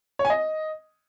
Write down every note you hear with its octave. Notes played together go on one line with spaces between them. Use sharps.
C#5
G#5
D#5